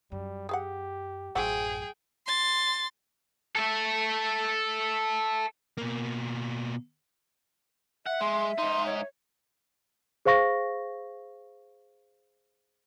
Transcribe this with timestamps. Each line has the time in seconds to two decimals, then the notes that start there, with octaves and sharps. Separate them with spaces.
0.12 F#2 G3
0.49 G4 G#4 F5 F#5
1.35 A1 F#2 F3 F#3 G#4 F#5 G5
2.27 C6 A6
3.55 A4 E5
5.78 B2 A#3
8.06 E5 F#5
8.21 G#3 C6
8.58 G#2 D#4 C6
8.86 C#5
10.25 G#4 C5 F5 C#6 A#6